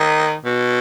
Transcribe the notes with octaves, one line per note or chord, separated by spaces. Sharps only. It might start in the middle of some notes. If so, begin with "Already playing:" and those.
Already playing: D#3
B2